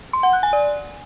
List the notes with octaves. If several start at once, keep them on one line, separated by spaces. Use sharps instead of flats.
C6
F#5
F#6
G#5
D5